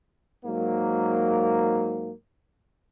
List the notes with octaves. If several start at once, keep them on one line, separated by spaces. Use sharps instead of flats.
G#2 F#3 A#3